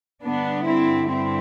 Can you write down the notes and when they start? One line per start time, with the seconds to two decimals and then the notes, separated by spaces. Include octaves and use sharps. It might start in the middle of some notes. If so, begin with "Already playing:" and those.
0.23 G2 D3 B3 D4
0.66 C4 E4
1.10 C4 E4